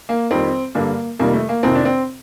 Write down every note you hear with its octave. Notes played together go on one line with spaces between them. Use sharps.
A#3
F2 D#3 G3 C4
G2 D3 G3 A#3
F2 C3 D#3 G3 A#3
A3
A#3
F2 C3 D#3 C4
D4
C4